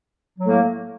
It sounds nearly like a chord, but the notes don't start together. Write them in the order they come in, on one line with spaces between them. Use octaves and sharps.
F#3 A3 A2 A#3